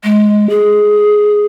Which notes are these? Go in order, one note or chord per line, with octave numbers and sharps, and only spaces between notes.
G#3
G#4